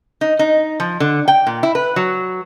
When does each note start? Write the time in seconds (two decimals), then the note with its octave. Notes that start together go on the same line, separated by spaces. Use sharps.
0.21 D#4
0.39 D#4
0.80 F3
1.00 D3
1.28 G5
1.47 A#2
1.63 E4
1.75 B4
1.96 F#3